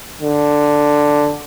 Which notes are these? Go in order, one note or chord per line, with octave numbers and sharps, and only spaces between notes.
D3